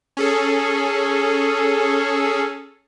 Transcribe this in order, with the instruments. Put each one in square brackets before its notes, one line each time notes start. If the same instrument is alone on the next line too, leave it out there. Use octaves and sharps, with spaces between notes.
[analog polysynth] C#4 G#4 A4